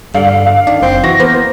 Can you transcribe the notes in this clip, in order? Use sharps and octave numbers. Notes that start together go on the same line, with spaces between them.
G2 D3 F5
F5
D#3 D4
F#1 C4
E3 F#4 A#6
A#3 B3 C5